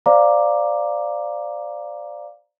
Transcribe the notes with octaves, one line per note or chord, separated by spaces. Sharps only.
C5 D5 F5 A#5 D6